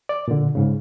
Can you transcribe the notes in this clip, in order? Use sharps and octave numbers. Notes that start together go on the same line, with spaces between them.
D5
A#2 D3
G#2 C#3